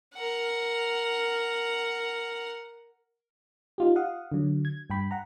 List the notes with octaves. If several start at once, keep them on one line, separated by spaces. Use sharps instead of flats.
A#4 F#5
D#4 F4 G4
F5 F#5 D#6
D3 F#3
G#6
G2 G5 B5
F#5 A#5